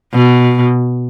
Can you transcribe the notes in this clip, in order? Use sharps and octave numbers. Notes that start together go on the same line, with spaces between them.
B2